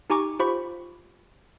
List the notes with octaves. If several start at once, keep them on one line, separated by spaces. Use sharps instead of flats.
D#4 G4 G#5 A#5 C#6 D6
F4 G4 C5 B5 C#6